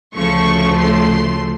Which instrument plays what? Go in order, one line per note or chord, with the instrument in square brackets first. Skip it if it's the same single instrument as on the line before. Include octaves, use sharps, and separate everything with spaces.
[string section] D2 C#3 F3 A3 C#6
C6